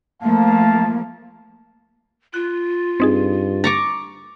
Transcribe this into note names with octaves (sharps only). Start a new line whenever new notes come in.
F3 A3 A#3 F5 A5
F4 F#6
G2 C4 D#4 G#4
A#5 C#6 D6 A6